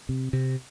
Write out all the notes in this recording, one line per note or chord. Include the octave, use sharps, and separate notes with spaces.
C3
C3